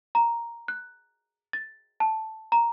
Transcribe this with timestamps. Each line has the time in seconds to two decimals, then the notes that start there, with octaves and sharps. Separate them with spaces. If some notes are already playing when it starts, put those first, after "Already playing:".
0.15 A#5
0.68 F#6
1.53 A6
2.00 A5
2.52 A#5